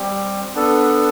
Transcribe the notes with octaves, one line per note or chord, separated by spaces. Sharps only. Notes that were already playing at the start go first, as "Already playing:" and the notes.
Already playing: G3 C4 G4
B3 D4 A4